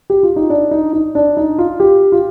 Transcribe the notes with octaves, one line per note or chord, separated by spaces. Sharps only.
G4
F4
D#4
D4
D#4
D#4
D4
D#4
F4
G4
F4